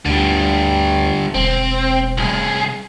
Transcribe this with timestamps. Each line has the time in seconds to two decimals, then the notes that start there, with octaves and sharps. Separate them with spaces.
0.06 D2 D3 G3
1.34 E1 C4
2.18 C2 G#4